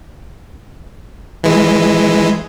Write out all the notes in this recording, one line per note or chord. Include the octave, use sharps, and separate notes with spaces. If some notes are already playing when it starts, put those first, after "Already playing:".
E3 G#3